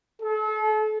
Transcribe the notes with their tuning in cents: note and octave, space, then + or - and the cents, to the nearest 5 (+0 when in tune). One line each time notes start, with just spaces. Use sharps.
A4 -35